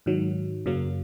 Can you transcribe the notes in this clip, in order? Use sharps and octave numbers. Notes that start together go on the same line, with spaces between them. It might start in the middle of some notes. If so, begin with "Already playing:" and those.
G#2 D#3 F#3
F#2 C#3 F#3 A#3